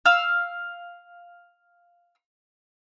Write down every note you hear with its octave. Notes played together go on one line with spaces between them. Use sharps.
F5 E6